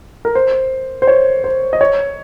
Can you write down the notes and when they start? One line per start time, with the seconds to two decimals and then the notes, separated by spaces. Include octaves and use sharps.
0.25 A#4
0.35 C5
1.02 C5
1.07 C#5
1.44 C5
1.73 D#5
1.81 C#5